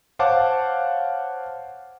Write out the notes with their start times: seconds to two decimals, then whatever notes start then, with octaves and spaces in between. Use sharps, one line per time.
0.19 C5 C#5 F5 F#5 A5 D6